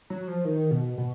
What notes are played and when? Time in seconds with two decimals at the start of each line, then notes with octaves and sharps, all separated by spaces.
0.10 F#3
0.27 F3
0.45 D#3
0.71 B2
0.98 B2